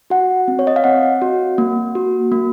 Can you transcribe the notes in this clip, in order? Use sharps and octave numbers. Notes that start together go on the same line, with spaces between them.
F#4 F#5
C4
C#5
D#5
F5
C4 F#5
F#4
A#3
F#4
A#3